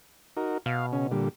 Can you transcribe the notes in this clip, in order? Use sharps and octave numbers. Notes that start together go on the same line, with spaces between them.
D#4 F#4 A#4
B2 F5
C#3 C#4
A#2 D3 G3